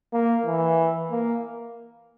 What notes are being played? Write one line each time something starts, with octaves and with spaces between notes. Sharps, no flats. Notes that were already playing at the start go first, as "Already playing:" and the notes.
A#3
E3
A#3